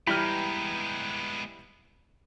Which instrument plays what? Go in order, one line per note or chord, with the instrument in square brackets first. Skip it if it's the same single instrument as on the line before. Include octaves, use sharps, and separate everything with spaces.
[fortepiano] E3 G3 F6 [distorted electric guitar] G#3 B3 [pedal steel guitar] G5 A#5 B5